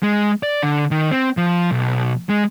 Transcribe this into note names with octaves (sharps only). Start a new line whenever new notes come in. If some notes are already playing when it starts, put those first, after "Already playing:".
G#3
D5
D3
D#3
C4
F3
B1
G#3